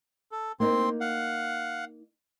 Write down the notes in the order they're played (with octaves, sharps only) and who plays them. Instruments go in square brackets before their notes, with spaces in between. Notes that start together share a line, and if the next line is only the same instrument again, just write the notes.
[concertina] A4
[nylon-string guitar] A#3 D#4 [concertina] C4 C6
[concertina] F5 F#5